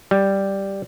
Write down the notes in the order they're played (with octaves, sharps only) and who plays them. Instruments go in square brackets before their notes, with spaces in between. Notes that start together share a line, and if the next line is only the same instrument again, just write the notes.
[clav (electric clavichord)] G3